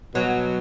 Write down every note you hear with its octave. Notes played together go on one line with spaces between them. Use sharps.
B2 F#3